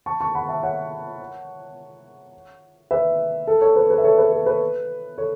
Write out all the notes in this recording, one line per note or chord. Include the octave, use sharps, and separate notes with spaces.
A5 C#6
A5 C#6
F#5 B5
E5 A5
C#5 F#5
B4 E5
A4
A4 C#5
B4
B4
E5
A4 C#5
B4
A4
B4
A4 C#5